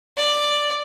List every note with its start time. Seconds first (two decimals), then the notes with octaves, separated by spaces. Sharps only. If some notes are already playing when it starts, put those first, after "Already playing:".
0.17 D5